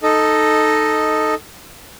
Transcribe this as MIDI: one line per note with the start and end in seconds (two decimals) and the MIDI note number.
0.03 1.34 63
0.03 1.34 69
0.03 1.34 75